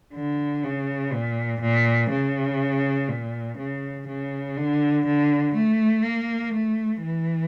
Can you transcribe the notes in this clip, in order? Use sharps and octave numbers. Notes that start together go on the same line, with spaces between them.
D3
C#3
A#2
A#2
C#3
A#2
C#3
C#3
D3
D3
A3
A#3
A3
E3